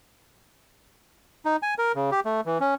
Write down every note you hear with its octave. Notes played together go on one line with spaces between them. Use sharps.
D#4
G#5
A#4
C#3
G4
A3
E3
C#4